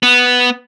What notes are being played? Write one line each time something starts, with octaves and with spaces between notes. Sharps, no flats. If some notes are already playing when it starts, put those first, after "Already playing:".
B3